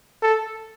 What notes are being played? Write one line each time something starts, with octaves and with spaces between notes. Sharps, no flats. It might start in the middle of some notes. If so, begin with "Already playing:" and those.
A4